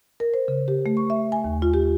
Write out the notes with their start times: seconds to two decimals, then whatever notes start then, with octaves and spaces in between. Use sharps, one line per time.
0.20 A#4
0.34 C5
0.48 C#3
0.68 G4
0.86 A3
0.97 C#6
1.10 E5
1.32 G#5
1.44 D#2
1.62 F4
1.74 G4